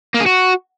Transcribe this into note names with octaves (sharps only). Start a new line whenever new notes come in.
A#3
G#4
F#4